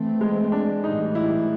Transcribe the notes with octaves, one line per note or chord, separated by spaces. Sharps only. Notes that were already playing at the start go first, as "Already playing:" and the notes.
Already playing: E3 A3 C4
G#3
D4
A2 E3 G3 D#4
E4